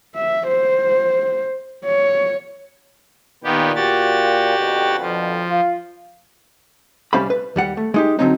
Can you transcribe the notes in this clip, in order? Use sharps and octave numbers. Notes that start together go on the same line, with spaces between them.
E5
C5
C#5
A#2 D#3 B3 G4
F#4 G4 A6
F2 B2 D3
F3
F4
C2 G3 C#4 C5 F5 B5
B4
D#2 G3 F#5
A3
G#3 D#4 G4
D3 F3 F#3 C4 C#4 D#4